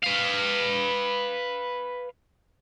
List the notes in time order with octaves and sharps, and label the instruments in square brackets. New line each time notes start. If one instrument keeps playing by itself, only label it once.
[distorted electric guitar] B4 F5